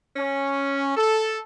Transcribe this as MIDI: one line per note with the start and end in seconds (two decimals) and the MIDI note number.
0.16 0.94 61
0.96 1.39 69